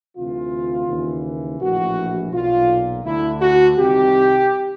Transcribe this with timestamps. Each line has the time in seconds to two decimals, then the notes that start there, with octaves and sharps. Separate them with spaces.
0.17 D2 C3 E3 F4
0.88 D#2 C#3 E3
1.60 A#1 A2 E3 F#4
2.32 B1 A#2 F4
3.04 D2 D3 E4
3.40 F#4
3.76 C2 C3 D#3 G4